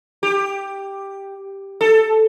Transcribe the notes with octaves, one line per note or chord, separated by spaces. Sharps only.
G4
A4